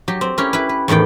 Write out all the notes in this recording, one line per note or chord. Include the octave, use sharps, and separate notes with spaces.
F#3 G4
C4
C#4 E4 G4 A#4
E4 B4
B4
E2 A2 D#3 D5 G5